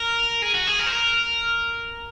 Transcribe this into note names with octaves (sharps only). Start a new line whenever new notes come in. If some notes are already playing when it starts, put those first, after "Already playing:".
Already playing: A#4
G#4
F#4
G#4
A#4
C5
A#4